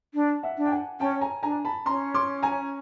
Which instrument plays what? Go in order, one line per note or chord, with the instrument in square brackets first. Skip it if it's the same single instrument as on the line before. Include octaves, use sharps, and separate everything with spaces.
[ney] D4
[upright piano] E5 F#5
[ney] D4
[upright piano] G5
F#5 G#5
[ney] C#4 [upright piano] G5 A5
[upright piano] G#5 A#5
[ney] D4 [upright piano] G#5 A#5
[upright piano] A5 B5
[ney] C#4 [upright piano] A#5 C6
[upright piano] C6 D6
G#5 A#5